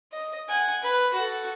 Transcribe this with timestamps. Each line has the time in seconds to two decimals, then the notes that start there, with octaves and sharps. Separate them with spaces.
0.12 D#5
0.48 F#5 G#5
0.83 B4
1.13 F#4 A4